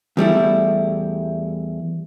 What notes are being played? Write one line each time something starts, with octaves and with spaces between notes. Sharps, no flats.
E2 G3 A3 E4